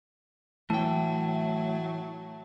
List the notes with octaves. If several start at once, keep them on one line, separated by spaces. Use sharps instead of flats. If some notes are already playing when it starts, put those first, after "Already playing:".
A2 E3 F#3 A3 G5 A5